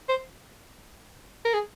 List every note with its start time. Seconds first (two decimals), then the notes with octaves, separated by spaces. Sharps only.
0.09 C5
1.45 A#4
1.53 G#4